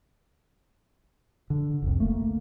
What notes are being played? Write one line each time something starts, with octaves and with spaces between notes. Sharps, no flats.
D3
F1 C2
A3 A#3